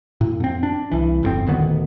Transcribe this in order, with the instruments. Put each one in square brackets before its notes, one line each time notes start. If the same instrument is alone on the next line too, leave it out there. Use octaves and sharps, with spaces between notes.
[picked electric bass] A2
F2 C4
D4
C2 E3
G1 F2 C4
D#1 D2 D#3 B3